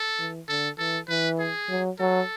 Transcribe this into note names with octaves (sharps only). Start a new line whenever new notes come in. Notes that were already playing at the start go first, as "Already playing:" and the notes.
Already playing: A4
E3
D3 A4
E3 A4
E3 B4
G#4
F#3
F#3 A4